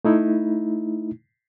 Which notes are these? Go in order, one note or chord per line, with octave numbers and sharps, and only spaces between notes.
A3 D#4 E4